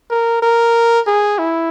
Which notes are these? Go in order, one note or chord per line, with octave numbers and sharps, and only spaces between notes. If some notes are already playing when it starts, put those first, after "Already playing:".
A#4
A#4
G#4
E4